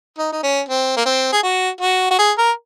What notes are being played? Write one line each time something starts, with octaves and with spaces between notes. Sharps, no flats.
D#4
D#4
C#4
C4
A#3
C4
G#4
F#4
F#4
F#4
G#4
A#4